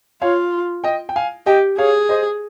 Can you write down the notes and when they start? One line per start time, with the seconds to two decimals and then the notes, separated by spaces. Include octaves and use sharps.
0.22 F4 C#5 F5
0.84 D#5 G5
1.09 G5
1.16 F5 G#5
1.46 G4 D#5 G5
1.78 G#4 C#5 F5
2.09 C5 D#5